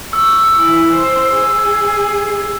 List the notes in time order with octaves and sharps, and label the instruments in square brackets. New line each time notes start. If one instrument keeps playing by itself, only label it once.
[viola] C#6 [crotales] E6
[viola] E3
C5
G#4